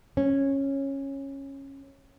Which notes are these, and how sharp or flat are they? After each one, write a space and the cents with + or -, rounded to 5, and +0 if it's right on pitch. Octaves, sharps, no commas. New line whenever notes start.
C#4 -15